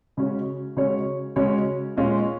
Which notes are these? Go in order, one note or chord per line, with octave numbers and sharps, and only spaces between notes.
C#3 G#3 C#4 F#4 C#5
C#3 G#3 C#4 F#4 C#5
C#3 G#3 C#4 F#4 C#5
A#2 G#3 C#4 F4